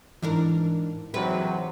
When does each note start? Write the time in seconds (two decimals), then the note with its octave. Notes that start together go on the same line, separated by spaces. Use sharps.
0.22 G#2 E3 D4 A#4
1.14 G#2 C3 F#3 B4